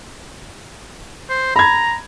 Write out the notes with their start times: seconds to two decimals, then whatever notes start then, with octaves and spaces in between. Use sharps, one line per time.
1.30 C5
1.56 A#5 B5 G#6